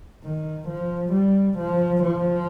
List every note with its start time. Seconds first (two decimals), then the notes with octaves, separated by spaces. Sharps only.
0.24 D#3
0.67 F3
1.12 G3
1.58 F3
2.02 F3